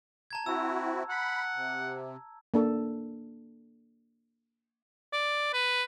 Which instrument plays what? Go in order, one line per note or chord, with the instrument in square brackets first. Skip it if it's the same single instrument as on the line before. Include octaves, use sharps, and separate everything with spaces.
[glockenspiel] A5 A#5 G#6
[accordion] C4 E4 F#4 [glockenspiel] E6
[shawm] F#5 [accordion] B5
[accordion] C3
[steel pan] A#3 D4 A4
[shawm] D5
B4